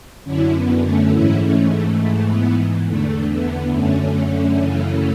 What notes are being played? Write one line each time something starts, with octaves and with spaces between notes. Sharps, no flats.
F#2 D3 C#4 E4
B3
A3 C#4
G#2 E3 C#4 E4
A3 C#4
A3
G#2 E3 A3
B3
E2 D3 A3
B3
F#2 D3 A3 C#4
F#2 C#3 E3